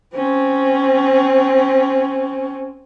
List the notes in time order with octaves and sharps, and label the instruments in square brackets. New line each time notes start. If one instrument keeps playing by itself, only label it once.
[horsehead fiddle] C4 C#4